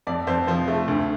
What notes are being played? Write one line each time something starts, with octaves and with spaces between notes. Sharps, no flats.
F2 D5
F2 C5
F3 C5
A3
D2